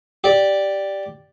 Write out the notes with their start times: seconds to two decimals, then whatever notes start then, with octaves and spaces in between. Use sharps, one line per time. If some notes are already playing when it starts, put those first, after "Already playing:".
0.24 G4 D5